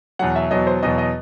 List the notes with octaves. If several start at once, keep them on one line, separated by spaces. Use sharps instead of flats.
E2 B2 F#3 F#5
E5
E2 B2 F#3 D#5
C5
E2 B2 F#3 D#5
D#5